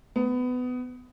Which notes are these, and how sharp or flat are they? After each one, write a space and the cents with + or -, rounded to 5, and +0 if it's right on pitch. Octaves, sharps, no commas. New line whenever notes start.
B3 +20